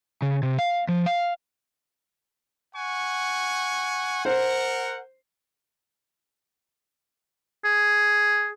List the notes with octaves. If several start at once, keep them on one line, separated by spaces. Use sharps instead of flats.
C#3
C3
F5
F3
F5
F#5 G#5 C#6
A#4 C5 F#5
G#4